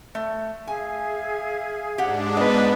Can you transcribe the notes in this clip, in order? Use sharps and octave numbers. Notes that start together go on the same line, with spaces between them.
A3
G#4 E5 F5 G#5
G#2 D4 G4 F#5
B3 F#4 B4 D5 D#5